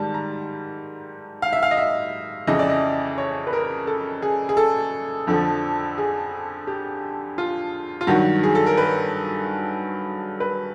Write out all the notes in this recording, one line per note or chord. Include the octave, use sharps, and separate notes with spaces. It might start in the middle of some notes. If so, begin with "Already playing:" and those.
Already playing: G#2 D#3 G3 A5
A#5
F5
E5
F5
D#5
E5
F2 C#3 E3 D#5
D5
D#5
C#5
B4
A#4
A4
G#4
G#4
A4
F2 D3 F3
G#4
G4
F4
F4
G2 D#3 F#3 F#4
G#4
A4
A#4
B4
B4